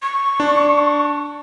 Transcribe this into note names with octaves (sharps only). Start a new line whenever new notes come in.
C#6
D4